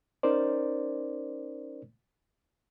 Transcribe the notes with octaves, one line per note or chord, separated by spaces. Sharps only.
C#4 D#4 A#4 C5 D5